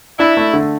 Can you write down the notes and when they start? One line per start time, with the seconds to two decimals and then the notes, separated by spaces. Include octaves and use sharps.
0.19 D4 E4
0.37 A3
0.54 D3